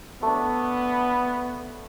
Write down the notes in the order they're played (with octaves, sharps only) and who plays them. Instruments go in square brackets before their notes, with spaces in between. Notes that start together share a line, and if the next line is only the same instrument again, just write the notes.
[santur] A3 D4 [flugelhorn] B3